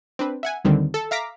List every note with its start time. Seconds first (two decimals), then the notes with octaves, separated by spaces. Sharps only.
0.19 C4 D4 B4
0.43 E5 F#5 G#5
0.64 D2 D3 D#3 G3 C4
0.94 A4
1.11 E5 F5 A#5 D6 B6